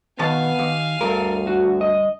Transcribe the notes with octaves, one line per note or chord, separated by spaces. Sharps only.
B2 D#3 B3 F5 G#5 A5
D#2
D2 G2 A4 A#4
F#4
D#5